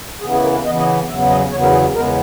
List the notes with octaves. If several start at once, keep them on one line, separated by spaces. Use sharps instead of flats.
C#3 E3 B3 G#4
G#4
A#4
B4
C#3 E3 B3 D#5
D#5
E2 C#3 F#3 B3 E5
D#5
E2 C#3 F#3 B3 C#5
A#4
G#4
E2 C#3 G#3 B3 A#4